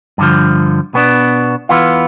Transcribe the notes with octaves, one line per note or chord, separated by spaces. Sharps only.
G2 D3 F3
B2 B3 D4
E3 B3 F4